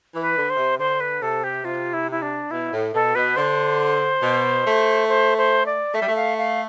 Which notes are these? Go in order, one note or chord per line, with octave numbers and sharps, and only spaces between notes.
E3
B4
D3
C5
C3
D3 C5
B4
C3 A4
G4
C3 F4
E4
E4
D4
B2 E4
A2
B2 A4
B2 B4
D3 C5
B2
A3
C5
C5
D5
A3 E5
G3
A3
F5
F5